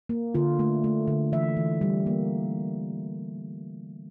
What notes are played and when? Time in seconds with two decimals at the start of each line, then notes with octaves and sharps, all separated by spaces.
0.09 A#3
0.34 D3 F4
0.59 A3
0.84 A3
1.07 D3
1.32 E3 E5
1.57 E3
1.81 G3
2.06 A#3